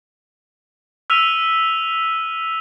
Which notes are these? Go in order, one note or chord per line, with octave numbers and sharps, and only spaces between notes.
E6 F6 B6 D#7 F7